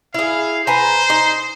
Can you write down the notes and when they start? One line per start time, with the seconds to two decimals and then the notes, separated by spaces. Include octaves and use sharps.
0.14 E4 G#4 F5
0.67 B4 C5 G#5 A#5
1.10 D#4